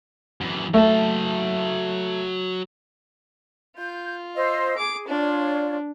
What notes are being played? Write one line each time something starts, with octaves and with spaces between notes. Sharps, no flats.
F#2 E3
F#3 A3 A5
F4 G6
C5 D#5 E6
G#4 D6
D4 F4 C#5 D5